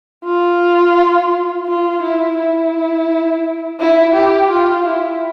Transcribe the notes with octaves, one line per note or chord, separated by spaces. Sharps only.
F4
F4
E4
E4
E4
G4
F4
E4